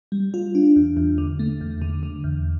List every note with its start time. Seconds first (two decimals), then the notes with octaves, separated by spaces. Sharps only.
0.12 G3
0.34 F4
0.55 D4
0.76 E2
0.97 E2
1.18 D3
1.39 A3
1.61 E2
1.82 D3
2.03 D3
2.24 E2